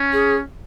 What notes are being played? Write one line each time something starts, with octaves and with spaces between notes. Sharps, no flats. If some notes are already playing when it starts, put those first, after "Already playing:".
Already playing: C#4
G#4